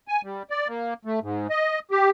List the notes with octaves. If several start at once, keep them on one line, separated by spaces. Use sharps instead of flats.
G#5
G3
D5
A#3
A3
G#2
D#5
G4